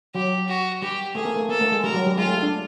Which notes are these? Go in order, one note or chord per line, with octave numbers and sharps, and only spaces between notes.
F#3 G4
F#4
G3 G4
A3 G#4
A#3
A3
A#3 A4
A3
G#3
G3 A#4
F#3
G3
G#3 F4
A3
D4